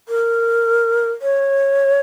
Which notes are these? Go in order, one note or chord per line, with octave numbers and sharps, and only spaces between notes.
A#4
C#5